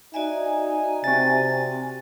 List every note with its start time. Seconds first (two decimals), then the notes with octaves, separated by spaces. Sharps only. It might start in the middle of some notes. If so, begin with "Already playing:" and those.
0.14 D#4 F#4 D5 E5 G#5
1.04 C3 C4 A6